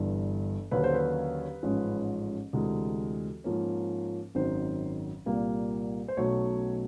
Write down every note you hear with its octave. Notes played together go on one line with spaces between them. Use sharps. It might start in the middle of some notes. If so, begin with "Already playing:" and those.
Already playing: G1 G2 E3
D#2 D3 F#3 A#3 C#4 B4
C5
B4
A1 G#2 F3 G#3 C#4
D2 C3 E3 G#3
G#2 F3 A#3 C#4
G#1 F#2 D#3 F#3 C5
C2 A#2 G3 A#3
C5
B1 B2 F#3 A3 C#4 C#5